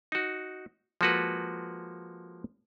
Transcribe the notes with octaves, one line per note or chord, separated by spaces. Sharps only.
D#4 F#4
F3 G#3 A#3 F#4 A4 B4